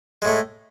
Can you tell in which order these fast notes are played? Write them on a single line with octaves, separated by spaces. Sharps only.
G#3 A2 A3